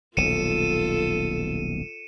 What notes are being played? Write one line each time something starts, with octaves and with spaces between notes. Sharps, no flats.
D#1 B1 F4 A4 C#7 D#7 E7